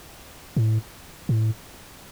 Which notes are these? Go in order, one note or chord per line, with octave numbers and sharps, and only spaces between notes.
A2
A2